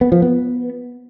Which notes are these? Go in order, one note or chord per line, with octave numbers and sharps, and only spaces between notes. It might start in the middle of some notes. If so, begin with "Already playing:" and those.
B3
F3
B3